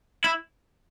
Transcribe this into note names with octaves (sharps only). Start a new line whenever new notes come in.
E4